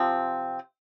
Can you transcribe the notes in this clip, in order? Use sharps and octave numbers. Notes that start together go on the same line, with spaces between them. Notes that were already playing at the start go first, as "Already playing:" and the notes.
Already playing: C3 F3 C4